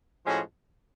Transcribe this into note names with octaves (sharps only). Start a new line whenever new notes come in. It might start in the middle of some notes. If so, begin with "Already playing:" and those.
A2 F3 G#3 C#4 F#4